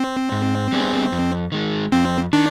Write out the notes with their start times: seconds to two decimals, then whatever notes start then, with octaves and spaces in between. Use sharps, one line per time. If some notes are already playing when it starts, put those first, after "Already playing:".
Already playing: C4
0.32 G#2
0.72 G3 B3 D4 G#4
1.12 F2
1.52 D#3 G#3
1.92 F2 C4
2.33 D#3 D4